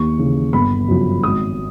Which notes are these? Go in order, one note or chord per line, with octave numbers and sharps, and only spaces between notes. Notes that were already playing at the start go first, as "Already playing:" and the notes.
Already playing: D#2 C#6
C#3 E3
G1 B5
F#2 C#3 F3
G#1 D#6